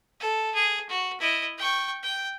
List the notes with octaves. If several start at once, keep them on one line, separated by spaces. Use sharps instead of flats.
A4
G#4
F#4
E4 D#5
G5 C#6
G5